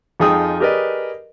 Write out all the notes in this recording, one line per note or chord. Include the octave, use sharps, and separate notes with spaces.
F2 F3 D#4 G#4 G5 D#6
G4 G#4 A#4 B4 D5 D#5